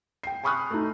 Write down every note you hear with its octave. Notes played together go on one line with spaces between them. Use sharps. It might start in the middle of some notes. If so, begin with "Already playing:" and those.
G5 C7
G#5 B5 C#6 D#6 F6 F#6
A3 D#4